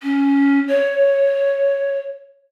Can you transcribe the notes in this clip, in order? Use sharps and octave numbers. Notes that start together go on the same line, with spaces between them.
C#4
C#5